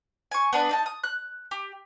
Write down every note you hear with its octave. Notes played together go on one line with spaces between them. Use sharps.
G#5 C#6
B3 D4 B4
D#4 A5
D#6
F#6
G4